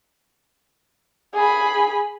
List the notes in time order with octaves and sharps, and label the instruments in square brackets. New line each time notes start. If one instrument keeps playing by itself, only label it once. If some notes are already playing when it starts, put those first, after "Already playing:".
[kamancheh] G#4 B5